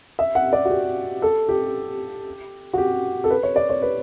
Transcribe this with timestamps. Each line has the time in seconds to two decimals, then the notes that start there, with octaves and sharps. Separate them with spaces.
0.19 E5
0.35 F#5
0.53 D5
0.65 F#4
0.70 G4
1.22 A4
1.49 G4
2.73 F#4
2.78 G4
3.24 A4
3.30 B4
3.43 C#5
3.56 D5
3.69 C#5
3.82 B4